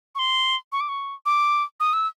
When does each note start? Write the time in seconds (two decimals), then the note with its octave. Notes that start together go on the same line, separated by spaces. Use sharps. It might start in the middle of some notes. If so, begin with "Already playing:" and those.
0.15 C#6
0.19 C6
0.72 C#6
0.81 D6
0.89 C#6
1.26 D6
1.80 D#6
1.93 E6